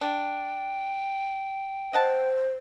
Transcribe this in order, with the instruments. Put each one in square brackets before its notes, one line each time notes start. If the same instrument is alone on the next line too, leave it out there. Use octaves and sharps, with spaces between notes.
[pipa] D4 [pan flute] G5
[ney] C5 [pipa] D#5 F#5 A5